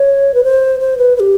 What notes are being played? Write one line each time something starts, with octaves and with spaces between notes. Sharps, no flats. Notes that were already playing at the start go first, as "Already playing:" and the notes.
Already playing: C#5
B4
C5
C5
B4
B4
G4